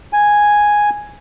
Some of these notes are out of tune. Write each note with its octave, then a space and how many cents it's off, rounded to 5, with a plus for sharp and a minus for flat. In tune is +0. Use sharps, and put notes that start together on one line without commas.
G#5 +0